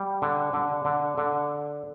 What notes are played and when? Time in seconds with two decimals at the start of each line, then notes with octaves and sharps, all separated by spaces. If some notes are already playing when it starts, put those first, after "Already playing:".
Already playing: G3
0.22 D3
0.53 D3
0.85 D3
1.18 D3